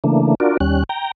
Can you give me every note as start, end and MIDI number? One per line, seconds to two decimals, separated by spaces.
0.04 0.35 49
0.04 0.35 52
0.04 0.35 57
0.04 0.35 58
0.04 0.35 62
0.40 0.57 62
0.40 0.57 65
0.40 0.57 66
0.40 0.57 70
0.40 0.57 74
0.60 0.84 39
0.60 0.84 55
0.60 0.84 61
0.60 0.84 90
0.89 1.11 79
0.89 1.11 82